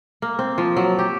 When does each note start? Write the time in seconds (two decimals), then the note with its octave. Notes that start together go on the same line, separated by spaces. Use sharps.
0.22 A#3
0.39 C4
0.58 F3
0.77 F#3
0.99 G4